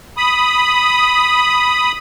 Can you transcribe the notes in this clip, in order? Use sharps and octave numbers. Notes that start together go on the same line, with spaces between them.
B5 D#6